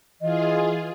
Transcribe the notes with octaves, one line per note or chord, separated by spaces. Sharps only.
E3 F4 G#4 D#5